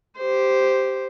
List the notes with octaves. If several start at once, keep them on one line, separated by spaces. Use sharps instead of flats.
G4 C5